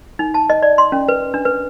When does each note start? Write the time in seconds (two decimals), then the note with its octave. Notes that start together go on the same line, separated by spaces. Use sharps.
0.19 D#4
0.34 A5
0.50 D#5
0.63 D5
0.78 C6
0.92 C#4
1.08 B4
1.34 D4
1.45 B4